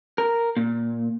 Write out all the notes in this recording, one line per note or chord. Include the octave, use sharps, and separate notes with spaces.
A#4
A#2